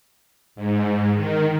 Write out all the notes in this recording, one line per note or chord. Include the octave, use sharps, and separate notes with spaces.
G#2
D#3